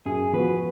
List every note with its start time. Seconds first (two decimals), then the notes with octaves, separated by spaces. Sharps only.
0.05 F#2 G#4
0.33 F3 B3 F#4 B4